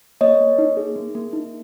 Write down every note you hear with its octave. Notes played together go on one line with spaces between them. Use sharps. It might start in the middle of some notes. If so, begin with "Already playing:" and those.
A#3 C#5 D#5
A#3
D#4
G#4
A#3
A#3
D#4